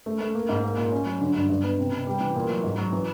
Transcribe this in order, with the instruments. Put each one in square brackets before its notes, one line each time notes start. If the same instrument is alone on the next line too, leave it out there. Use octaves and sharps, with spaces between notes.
[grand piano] A3
A3
A#3
G#2
A#3
A#2
C#4
F#3
D3
G2
G2
B3
C3
C3
G3
E3
A#2
F#3
G#2
F#3
E3